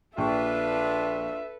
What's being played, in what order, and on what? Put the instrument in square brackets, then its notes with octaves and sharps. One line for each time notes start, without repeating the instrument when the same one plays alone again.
[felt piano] A#1 G5 C#6 [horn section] D4 F4 [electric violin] A4 B4 [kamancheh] E5